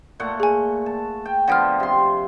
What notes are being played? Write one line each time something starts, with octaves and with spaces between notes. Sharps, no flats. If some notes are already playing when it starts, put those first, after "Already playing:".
A#2 A3 F#5
G#4 G#5
A5
G5
D3 F3 B3 F#5 G5 F6
C3 C6